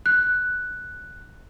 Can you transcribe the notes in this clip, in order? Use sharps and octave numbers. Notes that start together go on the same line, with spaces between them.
F#6